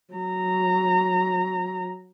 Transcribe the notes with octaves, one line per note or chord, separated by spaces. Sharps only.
F#3 A#5